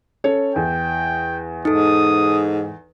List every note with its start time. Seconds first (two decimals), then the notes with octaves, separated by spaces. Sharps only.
0.24 C#4 A4 C#5
0.56 E2 G5
1.65 G#2 D#4 A4 D#6